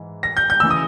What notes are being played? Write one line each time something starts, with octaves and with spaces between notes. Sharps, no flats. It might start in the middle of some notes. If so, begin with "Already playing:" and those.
Already playing: G#2 E3
A#6
G6
G6
C#3 E3 E6
D#6